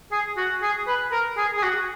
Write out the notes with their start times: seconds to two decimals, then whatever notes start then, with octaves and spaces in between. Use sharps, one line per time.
0.12 G#4
0.37 F#4
0.63 G#4
0.87 B4
1.12 A#4
1.37 G#4
1.57 G#4
1.63 F#4